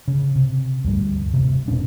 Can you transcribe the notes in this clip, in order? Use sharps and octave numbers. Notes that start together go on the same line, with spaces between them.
C#3
C3
D2 G2 G3
E1 C3
E1 A#2 C#4 D4